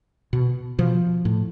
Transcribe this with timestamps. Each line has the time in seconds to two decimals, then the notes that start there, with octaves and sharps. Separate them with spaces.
0.33 B2
0.78 B2 F3
1.25 A2